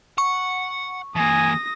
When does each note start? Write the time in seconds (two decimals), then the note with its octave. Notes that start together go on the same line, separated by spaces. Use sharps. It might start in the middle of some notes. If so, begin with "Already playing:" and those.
0.18 F#5 C#6
1.16 E3 A#3 G#5 D#6 A#6